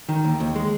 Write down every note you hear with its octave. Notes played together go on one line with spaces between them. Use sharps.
D#3
D#2
D#2
G#3